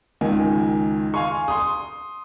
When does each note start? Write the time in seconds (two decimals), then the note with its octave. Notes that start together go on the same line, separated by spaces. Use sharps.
0.21 C#2 D#3 G#5
1.14 F5 G#5 C6 C#6
1.48 C6 D#6